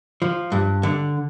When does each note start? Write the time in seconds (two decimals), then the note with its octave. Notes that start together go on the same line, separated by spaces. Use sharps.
0.22 F3
0.52 G2
0.83 D3